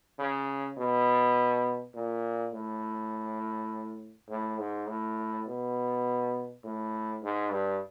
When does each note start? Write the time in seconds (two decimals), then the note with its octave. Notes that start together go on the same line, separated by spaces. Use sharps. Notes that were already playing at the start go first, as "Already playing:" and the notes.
0.19 C#3
0.77 B2
1.95 A#2
2.53 A2
4.29 A2
4.59 G#2
4.88 A2
5.47 B2
6.64 A2
7.23 G#2
7.52 G2